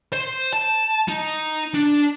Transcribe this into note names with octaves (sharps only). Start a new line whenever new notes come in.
C5
A5
D#4
D4